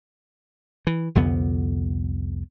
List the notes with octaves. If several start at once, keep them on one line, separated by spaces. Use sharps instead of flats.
E3
C2 F2 D3 B3